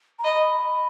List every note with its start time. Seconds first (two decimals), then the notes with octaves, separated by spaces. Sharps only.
0.19 A#5
0.24 D#5 B5